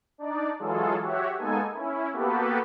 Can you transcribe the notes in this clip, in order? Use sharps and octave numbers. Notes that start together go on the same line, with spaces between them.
D4 D#4 D5
E3 F#3 G#3 F4 G#4 A4
F#4 G4 C#5 E5 F#5
G#3 A#3 B3 D#4 A4 G#5
C#4 E4
A#3 B3 F#4 G4 A4 B4